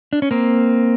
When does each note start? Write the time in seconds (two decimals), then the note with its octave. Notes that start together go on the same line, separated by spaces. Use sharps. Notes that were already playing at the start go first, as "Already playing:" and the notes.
0.13 D4
0.22 C#4
0.31 A#3 C4